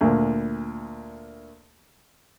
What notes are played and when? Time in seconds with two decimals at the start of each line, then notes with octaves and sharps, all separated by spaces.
0.01 D2 A#2